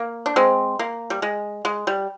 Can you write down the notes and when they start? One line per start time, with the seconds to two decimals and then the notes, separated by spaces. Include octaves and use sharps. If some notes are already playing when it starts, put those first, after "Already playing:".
Already playing: A#3
0.26 D4
0.36 G#3 C4
0.79 A#3
1.10 G3
1.22 G#3
1.65 G#3
1.87 G3